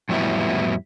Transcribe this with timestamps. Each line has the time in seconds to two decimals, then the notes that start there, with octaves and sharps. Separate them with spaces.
0.09 F2 A2 F#3 G3 B3 E4